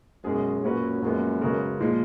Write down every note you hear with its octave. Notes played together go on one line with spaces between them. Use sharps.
F#2 B2 G#3 C#4 G#4
F#2 A#2 F#3 C#4 F#4 B4
F#2 A#2 F3 G#3 B3
C#3 G#3 B3 F#4 A#4
A#2 F3 G#3